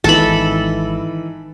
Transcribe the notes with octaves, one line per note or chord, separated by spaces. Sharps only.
G#1 D#3 E3 A4 B5